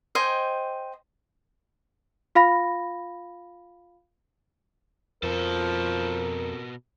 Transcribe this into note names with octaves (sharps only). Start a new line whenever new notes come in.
C5 D#5 G5 G#5
F4 F5 B5 A#6
F2 B2 F3 A4 A#4